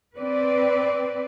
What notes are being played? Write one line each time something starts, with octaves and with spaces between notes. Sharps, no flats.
C4 B4 D5